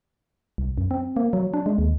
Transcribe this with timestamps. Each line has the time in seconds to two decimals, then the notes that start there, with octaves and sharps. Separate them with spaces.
0.58 C2
0.78 F#2
0.91 C4
1.17 A#3
1.33 F#3
1.54 D4
1.66 G#3
1.78 D#2